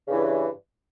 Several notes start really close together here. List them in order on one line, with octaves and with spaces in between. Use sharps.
C#3 G2 E3